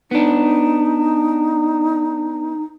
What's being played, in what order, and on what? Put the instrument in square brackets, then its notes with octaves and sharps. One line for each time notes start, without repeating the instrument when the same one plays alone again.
[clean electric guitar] B3 D4 [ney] D#4